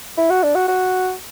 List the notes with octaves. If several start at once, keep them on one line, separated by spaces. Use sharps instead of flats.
E4
F#4
D4
F#4
F#4